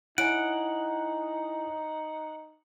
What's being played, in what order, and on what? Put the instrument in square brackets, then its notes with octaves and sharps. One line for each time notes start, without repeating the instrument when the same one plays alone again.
[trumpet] D#4 [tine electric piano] E4 C#5 G#5 [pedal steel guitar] F#5 [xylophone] D7